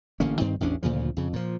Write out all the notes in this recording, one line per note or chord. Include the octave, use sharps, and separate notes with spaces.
A1 D3 A#3 C#4
G2 D#3 C4
A1 E2 C#4 D4
D2 A#2 C#3 F3
F2 C#3
A#2 F3